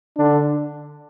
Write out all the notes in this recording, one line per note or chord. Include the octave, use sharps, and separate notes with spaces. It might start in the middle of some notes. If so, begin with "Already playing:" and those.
D3 D4